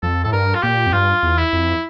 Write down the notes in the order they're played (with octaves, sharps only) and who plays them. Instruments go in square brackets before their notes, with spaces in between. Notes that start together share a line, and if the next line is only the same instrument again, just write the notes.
[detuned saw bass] F2 [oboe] A4
[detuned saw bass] A2 [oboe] A4
[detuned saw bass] G2 [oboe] A#4
[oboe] F4
[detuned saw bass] A#2 [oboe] G4
[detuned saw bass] F2
[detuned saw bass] G2 [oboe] F4
[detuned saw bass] E2
[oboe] E4
[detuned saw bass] F2